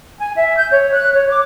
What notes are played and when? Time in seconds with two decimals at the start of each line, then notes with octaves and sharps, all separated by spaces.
0.20 G#5
0.35 E5
0.56 G6
0.72 C#5
0.93 F#6
1.15 C#5
1.29 D6